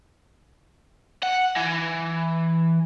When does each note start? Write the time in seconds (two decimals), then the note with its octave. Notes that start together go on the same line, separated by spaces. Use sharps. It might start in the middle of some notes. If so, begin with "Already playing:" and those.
1.23 F#5
1.56 E3